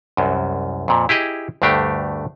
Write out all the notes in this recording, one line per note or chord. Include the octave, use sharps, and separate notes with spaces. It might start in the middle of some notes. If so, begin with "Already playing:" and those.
C2 F#2
F2 A#2
E4 G4 G#4 D#5
D2 G2 A3 D4 G4